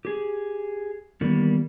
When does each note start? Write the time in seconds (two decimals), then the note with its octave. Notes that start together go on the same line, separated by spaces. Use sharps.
0.05 G4 G#4
1.21 D#3 E3 G3 A#3 B3